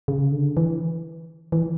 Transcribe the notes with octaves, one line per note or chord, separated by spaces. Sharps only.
C#3
D3
E3
E3